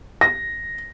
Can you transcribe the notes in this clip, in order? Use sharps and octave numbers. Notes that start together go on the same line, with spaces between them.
A#6